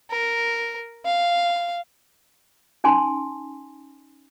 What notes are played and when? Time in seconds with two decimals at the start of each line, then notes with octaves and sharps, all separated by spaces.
0.11 A#4
1.05 F5
2.84 C#4 D#4 G#5 A5 C6